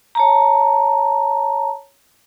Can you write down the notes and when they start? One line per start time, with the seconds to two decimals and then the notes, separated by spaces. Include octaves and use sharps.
0.15 C#5 A5 A#5